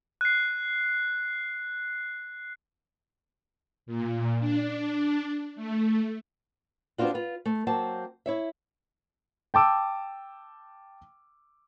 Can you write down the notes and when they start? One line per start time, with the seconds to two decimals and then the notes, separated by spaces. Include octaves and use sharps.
0.21 F#6 C7
3.86 A#2
4.39 D4
5.56 A3
6.98 B3 C4 D4 F4 F#4
7.14 F4 B4
7.46 A3
7.67 F#3 A#3 C4 A5
8.26 E4 C#5 E5
9.54 G5 A5 D6 E6